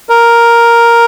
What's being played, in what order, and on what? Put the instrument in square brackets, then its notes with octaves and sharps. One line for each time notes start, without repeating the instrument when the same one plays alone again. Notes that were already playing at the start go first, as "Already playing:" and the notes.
[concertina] A#4